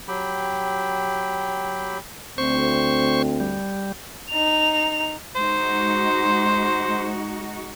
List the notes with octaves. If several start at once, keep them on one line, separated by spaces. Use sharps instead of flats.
F#3 G4 G5 B5
D2 C4 C5 C#6
G3
D#4 F7
G#3 D#4 F#4 C5